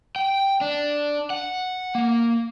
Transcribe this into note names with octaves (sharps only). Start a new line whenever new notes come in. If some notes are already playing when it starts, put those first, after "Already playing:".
G5
D4
F#5
A#3